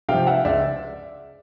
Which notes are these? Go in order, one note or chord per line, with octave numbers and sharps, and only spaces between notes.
C3 F5 G5
F3
E5 F#5
C#2 D5 E5